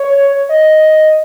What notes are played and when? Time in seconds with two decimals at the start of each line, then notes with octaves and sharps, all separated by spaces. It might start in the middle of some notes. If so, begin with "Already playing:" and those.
Already playing: C#5
0.49 D#5